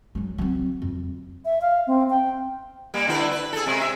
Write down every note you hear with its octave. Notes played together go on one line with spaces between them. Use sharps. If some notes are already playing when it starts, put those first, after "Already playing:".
F#3 G#3
F#3 C4
F2
E5
F5
C4
G5
G3 A#3
D3 E4 B4
B4
G#4 A4
C3 G#3
E5